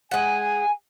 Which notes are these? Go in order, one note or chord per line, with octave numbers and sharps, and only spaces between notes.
G#3 F#5 G#5